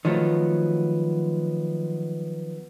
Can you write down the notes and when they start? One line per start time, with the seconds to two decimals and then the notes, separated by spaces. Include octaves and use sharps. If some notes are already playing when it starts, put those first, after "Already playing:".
0.05 D#3 F3 F#3 A3 B3